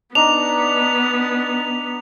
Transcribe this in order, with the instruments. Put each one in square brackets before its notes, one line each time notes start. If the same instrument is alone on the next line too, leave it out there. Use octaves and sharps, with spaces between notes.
[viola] B3 [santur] D4 D#4 [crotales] F7